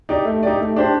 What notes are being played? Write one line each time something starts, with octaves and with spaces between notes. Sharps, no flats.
D#4 G4 D5
A3
D#4 G4 D5
A3
D4 G4 C5